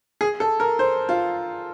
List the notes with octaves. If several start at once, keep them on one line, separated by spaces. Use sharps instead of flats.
G#4
A4
A#4
C5
F4